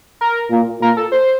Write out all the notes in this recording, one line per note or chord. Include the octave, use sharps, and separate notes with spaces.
A#4
A#2
A#2 A#4
A4
C5